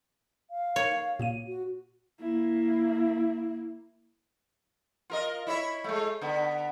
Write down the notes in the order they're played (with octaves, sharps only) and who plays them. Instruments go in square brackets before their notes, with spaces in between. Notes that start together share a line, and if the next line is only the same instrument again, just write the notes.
[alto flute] F5
[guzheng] C#5
[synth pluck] A#2 A#3 D#7
[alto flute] F#4
[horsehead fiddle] A#3 E4
[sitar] F4 A#4 D#5
E4 C#5 E5
G#3 A3
D3 B3